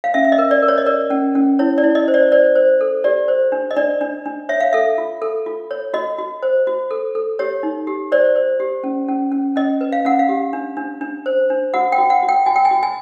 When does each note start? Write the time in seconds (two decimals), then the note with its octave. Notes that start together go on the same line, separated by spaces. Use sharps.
0.04 F5
0.14 C#4 E5
0.25 E5
0.32 D#5
0.38 A#4
0.51 D5
0.62 A#4
0.68 C#5
0.78 D#5
0.86 A#4 D5
1.10 C#4
1.35 C#4
1.59 E4 C#5
1.78 D5
1.83 E4
1.95 D#5
2.08 C5
2.14 D5
2.32 C5 D5
2.55 C5
2.81 A4
3.04 G4 D5
3.28 C5
3.52 D4
3.71 D#5
3.76 D4 D5
4.01 D4
4.26 D4
4.49 C#5 E5
4.61 F5
4.73 A4 E5
4.98 F4
5.22 A4
5.46 F4
5.71 C#5
5.94 F#4 D#5
6.19 F#4
6.43 C5
6.67 F#4
6.91 A4
7.15 A4
7.39 G4 C#5
7.63 D#4
7.87 G4
8.12 C5 D5
8.36 C5
8.60 G4
8.84 C#4
9.08 C#4
9.32 C#4
9.56 C#4 D#5
9.81 B4
9.92 F5
10.05 C#4 F#5
10.19 F5
10.29 G4
10.53 D4
10.77 D4
11.01 D4
11.26 C5
11.50 D4
11.74 F#4 F#5
11.92 G5
11.98 F#4
12.10 F#5
12.23 F#4
12.29 G5
12.46 F#4 G#5
12.56 G5
12.65 G#5
12.71 F#4
12.83 G#5